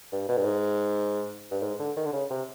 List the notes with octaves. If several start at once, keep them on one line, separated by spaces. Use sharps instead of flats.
G2
B2
G2
G#2
G2
G#2
D3
D#3
D3
C#3
C3